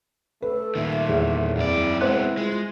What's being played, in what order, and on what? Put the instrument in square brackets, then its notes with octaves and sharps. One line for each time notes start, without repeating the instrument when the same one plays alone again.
[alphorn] A3 [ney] A4 [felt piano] B4
[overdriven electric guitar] A#2 D#3 [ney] E5
[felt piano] E2
[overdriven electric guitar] F#2 D5 [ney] C4 [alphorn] E4
[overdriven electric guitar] G#3 B3 [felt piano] C5 F#6
[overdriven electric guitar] G#3 [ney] F4